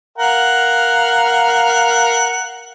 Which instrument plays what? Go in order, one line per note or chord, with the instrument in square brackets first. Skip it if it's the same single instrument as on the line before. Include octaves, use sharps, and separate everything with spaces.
[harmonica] A#4 F5 F#5